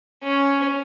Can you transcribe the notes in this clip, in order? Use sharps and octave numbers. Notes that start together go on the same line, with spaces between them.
C#4